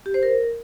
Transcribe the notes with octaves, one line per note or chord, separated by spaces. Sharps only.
G4
C5
A#4